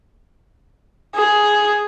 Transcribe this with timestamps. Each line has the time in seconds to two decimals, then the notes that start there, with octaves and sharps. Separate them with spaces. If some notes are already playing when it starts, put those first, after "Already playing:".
1.15 G#4